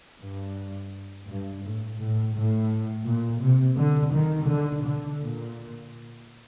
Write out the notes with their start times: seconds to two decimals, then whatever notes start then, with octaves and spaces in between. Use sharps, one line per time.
0.20 G2
1.26 G2
1.62 A2
1.97 A2
2.33 A2
3.05 A#2
3.40 C3
3.77 D3
4.11 D#3
4.47 D3
4.82 D3
5.19 A#2